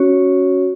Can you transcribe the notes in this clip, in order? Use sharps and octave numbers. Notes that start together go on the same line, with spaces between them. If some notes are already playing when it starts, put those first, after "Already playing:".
Already playing: C#4 F#4 C#5